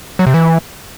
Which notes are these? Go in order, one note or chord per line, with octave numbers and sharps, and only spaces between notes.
F#3
C3
E3